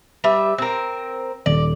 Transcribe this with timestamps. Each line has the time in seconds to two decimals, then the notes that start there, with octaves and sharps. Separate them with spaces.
0.24 G3 B4 E5
0.58 C4 A#4
1.46 D#1 D5